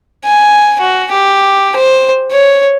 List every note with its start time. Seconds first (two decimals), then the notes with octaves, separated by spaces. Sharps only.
0.25 G#5
0.80 F#4
1.11 G4
1.76 C5
2.32 C#5